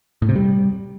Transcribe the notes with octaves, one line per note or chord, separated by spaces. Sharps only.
A2
C3
G3